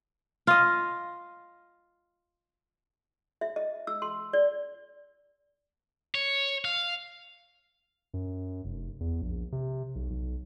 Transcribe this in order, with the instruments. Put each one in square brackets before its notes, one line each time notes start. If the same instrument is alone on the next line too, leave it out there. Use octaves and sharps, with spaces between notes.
[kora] F4 D#5
[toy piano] E5
D#5
E6
C6
D5
[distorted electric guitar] C#5
F5
[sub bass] F#2
F1
E2
A#1
C3
B1
B1